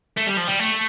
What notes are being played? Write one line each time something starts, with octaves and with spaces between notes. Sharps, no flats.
A3
G3
F3
G3
A3